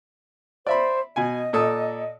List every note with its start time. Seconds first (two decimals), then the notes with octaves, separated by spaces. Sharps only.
0.67 C5 D5 E5 B5
1.16 B2 D#5 G#5
1.53 A#2 A4 D#6